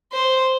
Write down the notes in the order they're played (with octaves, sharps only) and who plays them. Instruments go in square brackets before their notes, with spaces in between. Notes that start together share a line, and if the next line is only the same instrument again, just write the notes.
[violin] C5